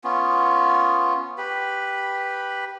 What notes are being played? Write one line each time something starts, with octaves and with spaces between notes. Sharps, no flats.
B3 C#4 F4
G4 B4 B5